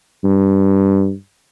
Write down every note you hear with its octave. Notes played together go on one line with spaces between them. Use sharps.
G2